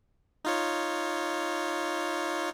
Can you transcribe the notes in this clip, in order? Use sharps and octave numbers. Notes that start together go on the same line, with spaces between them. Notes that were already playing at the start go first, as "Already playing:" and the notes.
D#4 F4 C#5